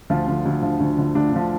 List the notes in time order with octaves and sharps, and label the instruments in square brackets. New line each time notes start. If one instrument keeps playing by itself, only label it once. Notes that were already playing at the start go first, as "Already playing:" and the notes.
[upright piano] D2 F3 F4
D3 F3
D2
D3 F3
D2
D3 F3
D2 D4
D3 F3